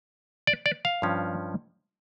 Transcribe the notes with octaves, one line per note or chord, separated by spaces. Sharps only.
D5
D5
F5
G2 F3 C#4